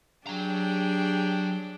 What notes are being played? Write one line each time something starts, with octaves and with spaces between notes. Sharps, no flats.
F#3 D4 G4 G#4 G5 A#5